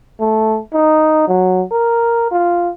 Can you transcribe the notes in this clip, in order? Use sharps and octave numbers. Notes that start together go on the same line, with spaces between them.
A3
D#4
F#3
A#4
F4